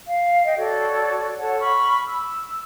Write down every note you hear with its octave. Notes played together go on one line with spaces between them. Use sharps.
F5
D#5 G5
F#4 A4 C#5 D5
A4 C#5 F#5 A5
B5 C#6 F6
E6